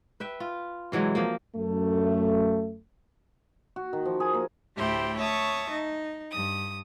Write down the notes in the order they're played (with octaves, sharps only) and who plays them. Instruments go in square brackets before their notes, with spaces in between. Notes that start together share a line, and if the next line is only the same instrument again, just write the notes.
[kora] B4 E5 G5
F4
C3 E3 F#3 G#3
F3 A#3
[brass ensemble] F#2 A3
[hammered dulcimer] F#4
D#3
F3
G#4
A#3
[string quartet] D2 A2 E4 G4 C5 G5
C#5 E5 A5 C#6 D#6
D#4
G2 D#6